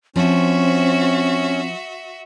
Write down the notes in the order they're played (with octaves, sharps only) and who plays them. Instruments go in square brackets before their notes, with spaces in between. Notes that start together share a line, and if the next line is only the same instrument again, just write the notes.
[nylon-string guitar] F3 [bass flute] C4 [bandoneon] C#4 [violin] F#4 E5